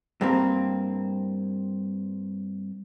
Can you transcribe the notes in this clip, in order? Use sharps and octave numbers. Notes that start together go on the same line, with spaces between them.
G2 A#3 C4